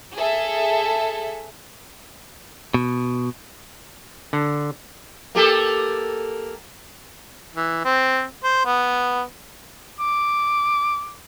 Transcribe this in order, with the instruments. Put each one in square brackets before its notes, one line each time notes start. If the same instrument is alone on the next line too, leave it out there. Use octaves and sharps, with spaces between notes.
[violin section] G#4 A4 E5
[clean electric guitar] B2
[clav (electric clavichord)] D3
[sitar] A#3 G4 A4
[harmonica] E3
C4
C5
B3
[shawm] D6